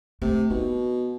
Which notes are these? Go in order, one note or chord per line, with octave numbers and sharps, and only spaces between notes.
C3 A3
B2 D#4